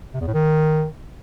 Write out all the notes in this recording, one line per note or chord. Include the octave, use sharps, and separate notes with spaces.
C3
E2
A2
D#3